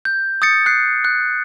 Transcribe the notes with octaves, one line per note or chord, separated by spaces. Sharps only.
G6
D#6 G6 A6 C#7
F#6 C7
F#6